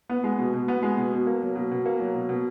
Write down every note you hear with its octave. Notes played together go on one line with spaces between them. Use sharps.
B3
G#3
B2
B2
B3
G#3
B2
B2
A#3
F#3
B2
B2
A#3
F#3
B2
B2